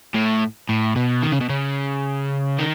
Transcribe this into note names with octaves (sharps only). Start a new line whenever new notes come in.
A2
A2
B2
D#3
C#3
B2
C#3
D#3